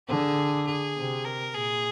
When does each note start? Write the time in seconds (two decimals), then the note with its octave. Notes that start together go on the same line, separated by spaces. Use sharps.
0.08 D3 G#4
0.67 G#4
0.96 C3
1.25 A#4
1.54 A#2 G#4